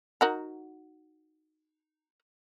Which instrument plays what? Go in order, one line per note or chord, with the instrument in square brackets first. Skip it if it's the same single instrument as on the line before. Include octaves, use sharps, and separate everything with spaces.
[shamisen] D#4 F#4 A#4